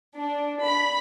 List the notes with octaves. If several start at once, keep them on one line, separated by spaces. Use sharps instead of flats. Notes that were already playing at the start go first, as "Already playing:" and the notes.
D4
B5